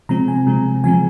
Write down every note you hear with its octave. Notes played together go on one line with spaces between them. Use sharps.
C3 F3 G#3 C4 A#5
G#5
C3 F3 G#3 C4
C#3 F3 G#3 C4 G#5